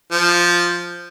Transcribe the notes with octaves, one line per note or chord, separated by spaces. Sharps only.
F3